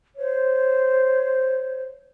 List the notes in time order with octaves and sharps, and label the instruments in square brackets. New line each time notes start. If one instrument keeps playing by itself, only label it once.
[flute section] C5 C#5